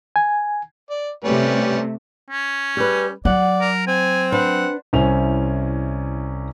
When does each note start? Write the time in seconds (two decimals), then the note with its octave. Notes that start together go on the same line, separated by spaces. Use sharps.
0.16 G#5
0.90 D5
1.24 C3 G3 A3 C#4 B4
2.30 C#4
2.77 G3 G#4 B4
3.25 F#3 D5 F#5
3.61 A#4
3.87 C4 G#5
4.32 D4 B4 C5 F#5
4.93 C2 C#4 E4 C5 G#5 F7